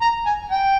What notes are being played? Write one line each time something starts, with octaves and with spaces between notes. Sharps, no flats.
A#5
G#5
G5